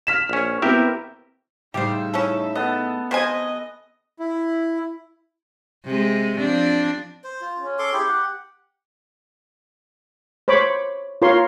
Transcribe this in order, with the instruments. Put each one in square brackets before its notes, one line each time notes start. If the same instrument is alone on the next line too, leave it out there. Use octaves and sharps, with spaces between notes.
[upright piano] F6 B6 E7
[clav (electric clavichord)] A#1 C#4
[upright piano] B3 C4 E4 [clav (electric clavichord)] G4 A#4 E5
[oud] A2 C#3 G3 [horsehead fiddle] D#4 E5 [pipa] G4 C5
[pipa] C#4 E4 A4
[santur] B3 A4 A5 [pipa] D#5
[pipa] C3 C5 G#5 [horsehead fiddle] D#5
[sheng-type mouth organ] E4
[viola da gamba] C3 G#3
F3 C4 D4
[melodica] C5
F4
[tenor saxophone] C#4
[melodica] A4 C6 D6
[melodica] E4 G#4 [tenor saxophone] G4
[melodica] F#5
[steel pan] C5 C#5 B5 D6
F4 A#4 C#5 C6